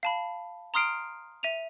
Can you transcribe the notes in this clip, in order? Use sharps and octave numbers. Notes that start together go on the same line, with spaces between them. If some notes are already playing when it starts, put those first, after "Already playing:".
F5 A5 B5
A#5 C6 D#6 F6 C7 D7
E5 D#7 F7